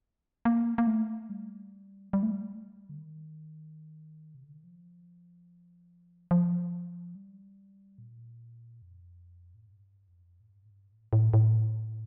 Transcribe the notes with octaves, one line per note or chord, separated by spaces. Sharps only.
A#3
A#3
A3
G3
G3
A3
G3
D3
D#3
C3
D3
D#3
F3
F3
G3
A#2
F2
A2
G2
F2
A2
G2
A2
G2
A2
A2
A2